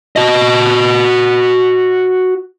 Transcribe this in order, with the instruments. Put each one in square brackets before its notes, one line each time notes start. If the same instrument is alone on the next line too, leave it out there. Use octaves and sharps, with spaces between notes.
[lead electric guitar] F#4 D#5